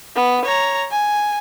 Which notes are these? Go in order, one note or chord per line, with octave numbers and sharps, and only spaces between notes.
B3
C#5 A#5
G#5